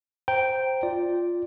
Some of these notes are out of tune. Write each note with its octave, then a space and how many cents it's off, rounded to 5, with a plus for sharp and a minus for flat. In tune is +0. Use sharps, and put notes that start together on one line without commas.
C5 +0 G5 -5 A#5 +0
F4 +0 D5 +0